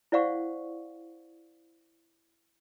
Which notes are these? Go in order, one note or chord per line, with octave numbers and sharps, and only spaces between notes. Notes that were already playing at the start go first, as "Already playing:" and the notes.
E4 C5 D5 F5 F#5 C#6